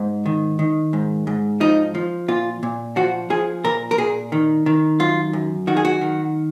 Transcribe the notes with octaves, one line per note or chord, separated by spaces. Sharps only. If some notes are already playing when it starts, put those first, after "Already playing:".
Already playing: G#2
D#3
D#3
G#2
G#2
F3 D#4
F3
A#2 F4
A#2
F3 F#4
F3 G#4
A#2 A#4
A#4
A#2 G#4
D#3
D#3
F#2 F4
F#2
D#3 F#4
G#4
F#4
D#3